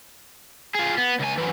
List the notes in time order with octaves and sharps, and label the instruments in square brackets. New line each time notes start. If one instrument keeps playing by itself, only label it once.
[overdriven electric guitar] F4 G#4
B3
C#2 G#5
E3 F#3